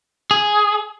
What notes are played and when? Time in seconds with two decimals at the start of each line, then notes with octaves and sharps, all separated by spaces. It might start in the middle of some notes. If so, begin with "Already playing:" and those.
0.31 G#4